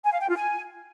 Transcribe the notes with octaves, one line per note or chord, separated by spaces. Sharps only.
G#5
F5
G5
F4
G#5